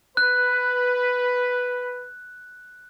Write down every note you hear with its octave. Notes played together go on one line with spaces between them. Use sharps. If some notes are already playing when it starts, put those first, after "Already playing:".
B4 F#6